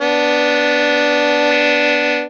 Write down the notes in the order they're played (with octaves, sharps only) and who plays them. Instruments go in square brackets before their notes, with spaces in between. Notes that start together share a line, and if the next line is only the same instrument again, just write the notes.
[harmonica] B3 D4